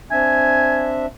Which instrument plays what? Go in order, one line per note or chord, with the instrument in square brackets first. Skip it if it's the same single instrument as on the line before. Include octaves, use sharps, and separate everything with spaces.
[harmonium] C4 D4 E5 [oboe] G#5